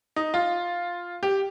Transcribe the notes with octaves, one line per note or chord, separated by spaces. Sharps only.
D#4
F4
G4